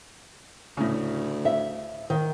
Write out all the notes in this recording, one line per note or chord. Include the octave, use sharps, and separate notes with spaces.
D2 A2 C#3
E5
D#3